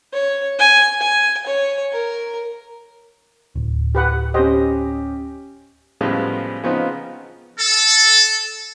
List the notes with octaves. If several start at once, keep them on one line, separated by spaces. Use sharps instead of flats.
C#5
G#5
G#5
C#5
A#4
D1
G4 B4 F#5
C#4 G4 C5 D#5
A2 C#3 F3 G3 G#3 B3
C#3 F3 B3 C4 D#4 F4
A4